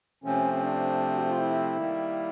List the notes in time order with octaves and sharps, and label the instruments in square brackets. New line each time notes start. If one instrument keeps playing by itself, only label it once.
[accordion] C3 F3 A3 C4 [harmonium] C#4
[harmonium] C#4
D4
F#4
F4
E4
[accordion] D#3 G3 A#3